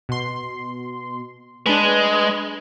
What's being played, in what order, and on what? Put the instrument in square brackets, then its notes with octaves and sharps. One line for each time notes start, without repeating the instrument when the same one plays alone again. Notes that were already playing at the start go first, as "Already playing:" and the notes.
[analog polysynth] B2 C6
[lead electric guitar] G#3 [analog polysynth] D4 B4